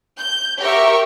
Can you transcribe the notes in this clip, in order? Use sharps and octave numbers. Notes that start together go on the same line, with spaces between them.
G6
G4 A#4 E5 C#6